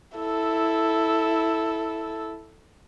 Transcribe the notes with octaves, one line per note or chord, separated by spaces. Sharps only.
E4 A4